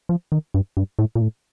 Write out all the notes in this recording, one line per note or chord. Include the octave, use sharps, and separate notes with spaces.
F3
D#3
G2
G2
A2
A#2
A2